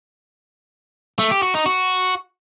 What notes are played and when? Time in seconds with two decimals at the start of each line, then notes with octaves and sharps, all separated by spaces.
1.19 A3
1.31 G4
1.42 F#4
1.54 D#4
1.66 F#4